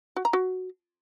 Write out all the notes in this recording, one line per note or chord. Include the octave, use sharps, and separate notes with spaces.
F#4
A#5
F#4